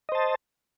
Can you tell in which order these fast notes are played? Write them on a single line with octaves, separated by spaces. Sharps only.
D#5 C5 A5